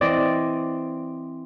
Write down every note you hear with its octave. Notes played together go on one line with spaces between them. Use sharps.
E3 C4 D5 D#5